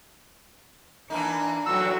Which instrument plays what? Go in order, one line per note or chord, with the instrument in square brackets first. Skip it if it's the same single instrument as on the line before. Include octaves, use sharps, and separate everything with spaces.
[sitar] E3 A#3 D#4 [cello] D4
[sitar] E2 A2 [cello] F#3 F#4 [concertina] E6